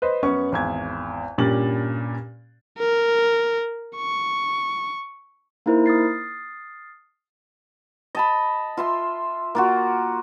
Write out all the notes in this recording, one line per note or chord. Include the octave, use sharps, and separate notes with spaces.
B4 C5 D#5
F#2 B3 C#4 C#6
G#1 E2 G#6
G2 A#2 C#4 G4 A6 F#7
A#4
C#6
A#3 D#4 E4 A#4 C5
D#6 F6 A6 C7
D#5 A5 B5
F4 E5 C6
A#3 F4 F#4